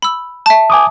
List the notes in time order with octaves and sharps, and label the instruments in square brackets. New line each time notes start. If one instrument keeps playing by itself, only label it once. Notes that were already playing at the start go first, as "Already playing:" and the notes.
[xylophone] B5 E6
E5 A5
[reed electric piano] G#5 D6 D#6